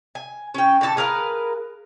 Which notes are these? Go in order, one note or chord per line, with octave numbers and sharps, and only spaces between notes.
G#5
C#4 G5
D3 E3 A4 A5
G#4 A#4 B4 F5